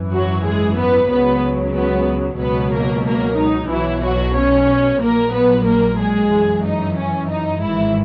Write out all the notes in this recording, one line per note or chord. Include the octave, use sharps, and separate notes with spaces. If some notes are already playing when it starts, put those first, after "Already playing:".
Already playing: G#1 F#2 E3
F#3 F#4
G#3 G#4
B3 B4
C#2 C#3 F#3 B3 B4
B3 B4
C#2 B2 F#3 B3 B4
A#3 A#4
A#3 A#4
D#4
B1 B2 E3 F#3 E4
F#3 F#4
C#4 C#5
A#1 A#2 F#3 A#3 A#4
B3 B4
A#3 A#4
G#3 G#4
F#2 E3
D#4
C#4
D#4
G#1 G#2 D#3 E3 F#3 E4